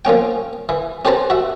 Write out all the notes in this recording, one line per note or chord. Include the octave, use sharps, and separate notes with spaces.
F3 A#3 C#4 G5
E3
C#4 G4 B4 C5 A5 A#5
F#4 E5